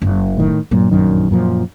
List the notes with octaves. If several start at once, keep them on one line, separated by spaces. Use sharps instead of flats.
F#1
A2 D#3
G2 A#2 F#3
A#1 F#2 D#3
F#2 A#2 F3